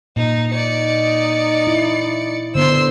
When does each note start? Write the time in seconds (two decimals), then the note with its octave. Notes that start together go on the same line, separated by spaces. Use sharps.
0.16 A#2 D#4
0.52 D#4 D5 C#7
1.67 E4
2.55 D3 B3 D4 C5 C6 E6